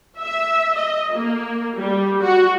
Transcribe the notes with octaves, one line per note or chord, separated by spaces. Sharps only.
E5
D#5
A#3
G3
F#4